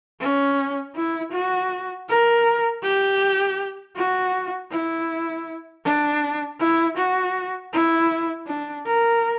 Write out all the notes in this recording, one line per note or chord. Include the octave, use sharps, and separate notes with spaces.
C#4
E4
F#4
A#4
G4
F#4
E4
D4
E4
F#4
E4
D4
A#4